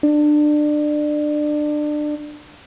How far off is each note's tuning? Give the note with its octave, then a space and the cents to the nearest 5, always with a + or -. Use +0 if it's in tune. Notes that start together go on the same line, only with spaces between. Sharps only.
D4 +25